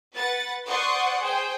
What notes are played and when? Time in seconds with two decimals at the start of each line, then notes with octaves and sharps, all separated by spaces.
0.14 B4 F#5 A6
0.67 C5 D5 F#5 C6 C#6 D#6
1.19 G#4 C5 G5